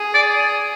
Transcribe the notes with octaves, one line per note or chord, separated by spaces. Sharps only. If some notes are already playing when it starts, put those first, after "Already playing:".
Already playing: G#4
D5